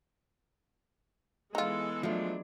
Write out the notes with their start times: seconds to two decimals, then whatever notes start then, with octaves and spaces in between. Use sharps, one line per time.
1.55 E3 G#3 B3 D#4 F4 A4
2.03 F3 F#3 A3 D4